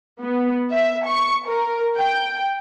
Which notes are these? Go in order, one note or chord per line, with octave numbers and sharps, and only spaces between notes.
B3
E5
C#6
A#4
G5